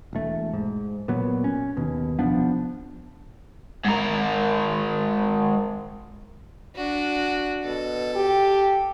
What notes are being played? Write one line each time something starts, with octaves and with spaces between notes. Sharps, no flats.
E1 A3
G#2
A#2 F#3 B3
C#4
D#2 B2
F1 F3 B3 D4
G#2 A#4
D4 F#4
B2 A4
G4